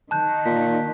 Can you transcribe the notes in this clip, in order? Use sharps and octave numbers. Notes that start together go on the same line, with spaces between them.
D#3 A5 F#6 G6
A#2 B6